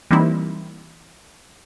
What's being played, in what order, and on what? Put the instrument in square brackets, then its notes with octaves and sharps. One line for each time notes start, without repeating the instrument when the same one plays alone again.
[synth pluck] E3 G3 A#3 C4 D#4 E4